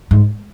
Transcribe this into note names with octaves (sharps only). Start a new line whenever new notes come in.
G#2